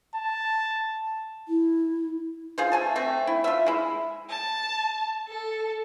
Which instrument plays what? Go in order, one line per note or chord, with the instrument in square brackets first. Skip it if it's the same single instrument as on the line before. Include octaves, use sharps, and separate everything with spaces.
[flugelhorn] A5
[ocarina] E4
[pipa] F4 G#4 C5
A3 G#5 A5
A3 C4
E4
F4 E5
G#3 E4
[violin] A5
A4